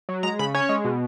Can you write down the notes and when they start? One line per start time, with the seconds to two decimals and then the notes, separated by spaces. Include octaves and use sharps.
0.09 F#3
0.23 G#3 A#5
0.39 C#3 B5
0.54 C#4 C#5
0.69 G#3
0.85 B2